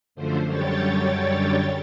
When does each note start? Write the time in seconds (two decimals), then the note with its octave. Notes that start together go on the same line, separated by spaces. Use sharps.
0.15 F#2 D3 F3 A3 C5
0.46 F#2 D3 G3 C#5 G5 A6